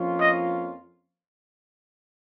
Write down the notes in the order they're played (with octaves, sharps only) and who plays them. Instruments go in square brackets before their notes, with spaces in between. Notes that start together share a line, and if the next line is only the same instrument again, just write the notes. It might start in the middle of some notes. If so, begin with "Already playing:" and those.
Already playing: [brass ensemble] F2 F3 A#3 C#4 F4
[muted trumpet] D#5